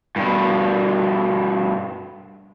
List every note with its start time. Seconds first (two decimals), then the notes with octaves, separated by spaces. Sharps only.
0.16 G2 B2